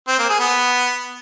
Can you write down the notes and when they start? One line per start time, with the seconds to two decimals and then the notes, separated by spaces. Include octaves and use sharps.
0.08 C4
0.19 A#3
0.29 G#4
0.40 B3